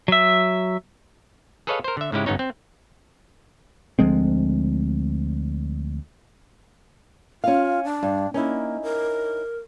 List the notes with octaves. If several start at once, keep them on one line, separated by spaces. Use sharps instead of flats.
F#3 E5
G#4 A4 B4 C#5 D#5 F5
A#4 C5
D3 E5
G#2 C#3 G#3 C#4 E4 G4
G1 G2 B3 C#4 D#4 C#5
C4
D2 F3 G#3 C4
C#4 F4 F5
D4
G2
A#3 C#4 D#4 E4
A#4